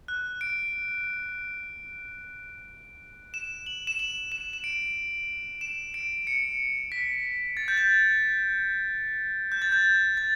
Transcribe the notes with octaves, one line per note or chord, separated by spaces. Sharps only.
F#6
D7
E7
F#7
E7
F#7
E7
E7
D7
E7
D7
C#7
B6
A6
G6
A6
G6
A6
G6
A6